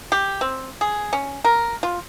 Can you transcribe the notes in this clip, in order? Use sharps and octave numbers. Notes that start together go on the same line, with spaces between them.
G4
C4
G#4
C#4
A#4
F4